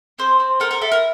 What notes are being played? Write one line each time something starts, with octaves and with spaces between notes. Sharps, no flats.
C4 C5
C4
A4 A#4
A#4
E4 A4
A#4